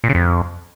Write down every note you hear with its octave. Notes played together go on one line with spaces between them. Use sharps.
A#2
C#3
F2